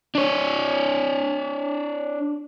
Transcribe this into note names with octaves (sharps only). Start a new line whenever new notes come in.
D4 C#5